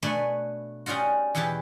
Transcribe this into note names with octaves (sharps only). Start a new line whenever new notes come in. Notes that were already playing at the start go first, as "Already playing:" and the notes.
B2 A3 D4 B4 C#5 G#5
G3 C#4 D#4 F4 F#4
E2 B2 E4 G4 A5